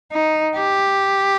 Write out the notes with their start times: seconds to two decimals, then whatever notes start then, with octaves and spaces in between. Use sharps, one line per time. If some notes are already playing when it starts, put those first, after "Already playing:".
0.12 D#4
0.57 G4